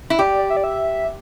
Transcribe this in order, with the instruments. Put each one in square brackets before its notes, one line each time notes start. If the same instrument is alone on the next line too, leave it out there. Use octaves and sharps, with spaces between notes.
[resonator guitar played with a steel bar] E4
[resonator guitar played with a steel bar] G4 [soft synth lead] D5
[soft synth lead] E5
D5
E5